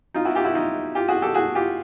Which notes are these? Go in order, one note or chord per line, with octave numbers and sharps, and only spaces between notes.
D#4 F4
E4 F#4
F4 G4
E4 F#4
D#4 F4
F4 G4
F#4 G#4
G4 A4
F#4 G#4
F4 G4